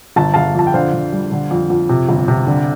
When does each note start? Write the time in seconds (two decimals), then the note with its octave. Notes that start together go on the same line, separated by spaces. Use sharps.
0.16 G1 A5
0.34 G1 F5 A5
0.55 F2 A5
0.67 G5
0.74 D3 C5 F5
0.93 D3
1.13 G3
1.32 D3
1.51 F2
1.70 F2
1.89 C3
2.09 G1
2.28 C3
2.47 D3